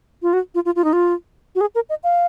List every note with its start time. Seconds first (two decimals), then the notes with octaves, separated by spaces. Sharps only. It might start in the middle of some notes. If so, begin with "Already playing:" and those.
0.22 F4
0.33 F#4
0.55 F4
0.65 F4
0.76 F4
0.84 D#4
0.93 F4
1.55 F#4
1.61 G#4
1.75 A#4
1.89 D#5
2.04 F5